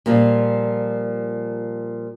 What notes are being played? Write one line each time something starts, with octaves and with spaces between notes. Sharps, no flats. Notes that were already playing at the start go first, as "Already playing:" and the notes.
A#2 F3 G3